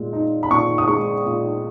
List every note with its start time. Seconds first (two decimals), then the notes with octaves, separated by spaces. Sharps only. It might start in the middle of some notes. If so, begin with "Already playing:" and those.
Already playing: A#2 G#3
0.13 D#4
0.43 B5
0.51 A#2 C#6
0.78 D#6
0.88 G#3 C#6
1.26 A#2